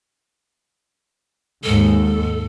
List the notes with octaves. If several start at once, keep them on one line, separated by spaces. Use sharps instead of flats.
D#2 G#2 A4